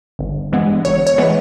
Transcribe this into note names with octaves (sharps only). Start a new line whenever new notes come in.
G1
G2 E3 G#3 B3
G1 C#5
C#5
E3 G#3 B3